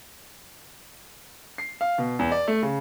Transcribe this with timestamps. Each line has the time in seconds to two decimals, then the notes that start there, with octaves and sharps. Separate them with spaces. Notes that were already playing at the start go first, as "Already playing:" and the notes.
1.58 C7
1.81 F5
1.98 B2
2.19 E2
2.32 D5
2.47 A3
2.63 C#3